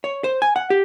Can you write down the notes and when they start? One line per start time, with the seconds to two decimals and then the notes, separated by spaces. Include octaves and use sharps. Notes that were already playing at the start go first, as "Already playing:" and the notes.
0.04 C#5
0.24 C5
0.42 G#5
0.56 F#5
0.70 G4